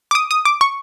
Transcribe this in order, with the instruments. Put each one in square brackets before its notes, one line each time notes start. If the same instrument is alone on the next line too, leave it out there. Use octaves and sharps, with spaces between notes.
[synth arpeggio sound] D6
D#6
D#6
D6
C#6